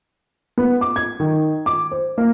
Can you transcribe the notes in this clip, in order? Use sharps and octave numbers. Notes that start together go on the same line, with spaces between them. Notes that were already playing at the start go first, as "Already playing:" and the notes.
B3
D6
G#6
D#3
D6
C5
A#3